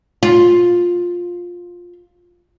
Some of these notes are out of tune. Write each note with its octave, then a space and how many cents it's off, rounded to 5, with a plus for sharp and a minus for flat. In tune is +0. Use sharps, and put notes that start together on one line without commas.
F4 +10